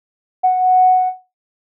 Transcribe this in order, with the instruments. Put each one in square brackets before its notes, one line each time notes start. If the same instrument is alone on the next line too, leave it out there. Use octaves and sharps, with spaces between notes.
[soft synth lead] F#5